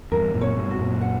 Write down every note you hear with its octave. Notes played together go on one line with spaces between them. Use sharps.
E2 G2 A#4
F#2 A#2
C#5
G2 B2
F#4
F#2 A#2
F#5